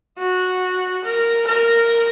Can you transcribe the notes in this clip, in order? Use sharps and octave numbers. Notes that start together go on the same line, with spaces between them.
F#4
A#4
A#4